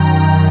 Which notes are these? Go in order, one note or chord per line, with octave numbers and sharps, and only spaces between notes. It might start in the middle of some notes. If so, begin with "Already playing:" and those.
Already playing: F#2 D#3 G5 A#5